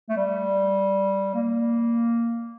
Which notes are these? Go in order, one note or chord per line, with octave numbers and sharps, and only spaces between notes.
A3
G3
A#3